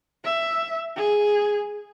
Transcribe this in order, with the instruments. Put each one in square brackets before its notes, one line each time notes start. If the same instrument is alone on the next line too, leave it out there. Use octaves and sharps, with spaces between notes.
[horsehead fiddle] E5
G#4